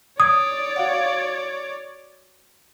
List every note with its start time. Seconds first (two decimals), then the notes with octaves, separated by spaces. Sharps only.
0.20 C#5 D5 D#6 G#6
0.76 F#4 F5 F#5